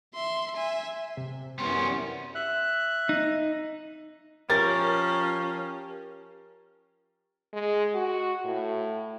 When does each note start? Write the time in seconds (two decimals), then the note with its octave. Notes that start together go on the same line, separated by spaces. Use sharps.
0.14 E5 C6
0.56 E5 G#5
1.17 C3
1.59 F#2 E3 G3 B3 C#4 C6
2.35 E5 F#6
3.09 D#4
4.50 F3 C#4 G4 A#4 A6
7.53 G#3
7.94 F#4
8.45 A2